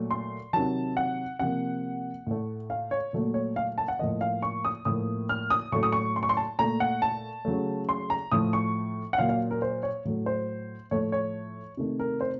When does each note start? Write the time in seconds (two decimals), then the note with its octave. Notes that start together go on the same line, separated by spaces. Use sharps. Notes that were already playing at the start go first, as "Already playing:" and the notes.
Already playing: A#2 F#3 A3
0.11 C6
0.53 C3 D#3 F#3 A5
0.97 F#5
1.39 C3 F3 A#3 F#5
2.27 A2 A3
2.70 F5
2.91 C#5
3.13 A#2 F#3 A3
3.34 C#5
3.56 F5
3.78 A5
3.88 F#5
3.99 A2 F3 A#3 D#5
4.21 F5
4.42 C#6
4.65 D#6
4.85 A2 F3 A#3 D#6
5.29 F6
5.50 D#6
5.72 A2 F#3 A3 C#6
5.83 D#6
5.92 C#6
6.16 C6
6.23 C#6
6.29 C6
6.37 A5
6.59 A#2 A3 A#5
6.80 F#5
7.02 A5
7.45 C#3 F#3 A3
7.89 C6
8.10 A#5
8.32 A2 F3 A3 D#6
8.53 C#6
9.13 F#5
9.18 A#2 F#3 A#3 F5
9.29 F5
9.51 A#4
9.62 C5
9.83 C#5
10.05 A2 F#3 A3
10.26 C5
10.91 A2 F3 A3 C#5
11.12 C#5
11.77 C3 D#3 A3
12.00 A#4
12.21 C5